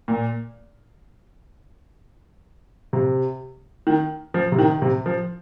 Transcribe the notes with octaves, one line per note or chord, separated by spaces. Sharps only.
A#2
C3
D#3
F3
C3
D#3
C3
F3